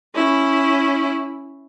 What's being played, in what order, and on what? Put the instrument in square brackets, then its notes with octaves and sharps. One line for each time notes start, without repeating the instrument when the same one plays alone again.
[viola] C#4 E4